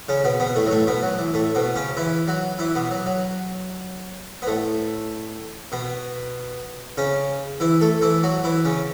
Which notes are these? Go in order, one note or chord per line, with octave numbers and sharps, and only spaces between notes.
C#3 C#4
B2 B3
B2 B3
A2 A3
F#3
A2 A3
B2 B3
F#3
E3
A2 A3
B2 B3
C#3 C#4
E3 E4
F#3 F#4
E3 E4
B2 B3
F#3
F#3
B3
A2 A3
B2 B3
C#3 C#4
E3 E4
A3 A4
E3 E4
F#3 F#4
E3 E4
C#3 C#4